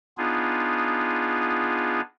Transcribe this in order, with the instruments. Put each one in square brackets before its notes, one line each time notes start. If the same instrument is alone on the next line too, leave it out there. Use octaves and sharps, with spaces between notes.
[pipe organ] B3 D4 D#4 F4 G#4